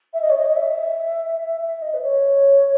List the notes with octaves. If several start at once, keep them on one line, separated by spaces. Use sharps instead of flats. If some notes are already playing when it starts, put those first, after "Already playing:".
E5
D#5
C#5
D#5
D#5
E5
E5
E5
D#5
B4
C#5